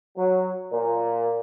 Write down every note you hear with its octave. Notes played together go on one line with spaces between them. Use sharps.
F#3
A#2